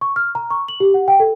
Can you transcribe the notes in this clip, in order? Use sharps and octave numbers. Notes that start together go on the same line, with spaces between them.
C#6
F6
A#5
C#6
F#7
G4
F#5
G5
A4